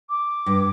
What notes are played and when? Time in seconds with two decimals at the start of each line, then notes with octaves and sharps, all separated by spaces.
0.09 D6
0.46 G2